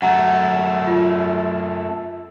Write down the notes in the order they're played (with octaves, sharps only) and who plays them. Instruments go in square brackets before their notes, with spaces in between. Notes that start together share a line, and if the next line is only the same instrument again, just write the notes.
[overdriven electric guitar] F#2 A3 [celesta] F#5 A#5
[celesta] F4